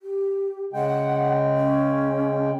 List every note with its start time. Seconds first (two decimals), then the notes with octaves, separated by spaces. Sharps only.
0.02 G4
0.73 C#3 G#3 F#5 G5
1.57 C#4